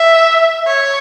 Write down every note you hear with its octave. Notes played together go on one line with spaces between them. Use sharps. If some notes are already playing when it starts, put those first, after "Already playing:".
Already playing: E5
C#5